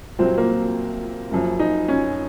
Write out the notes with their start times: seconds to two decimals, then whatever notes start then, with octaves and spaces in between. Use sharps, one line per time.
0.19 C2 A#2 F#3 C4
0.37 A#3
1.31 F#1 F#2 F3
1.60 D#4
1.88 C#4